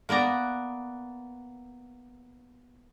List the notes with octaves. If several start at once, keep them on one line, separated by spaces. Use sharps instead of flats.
A#3 B3 D5 A#5